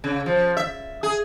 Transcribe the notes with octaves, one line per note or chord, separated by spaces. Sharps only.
C#3
F3
E5
G#4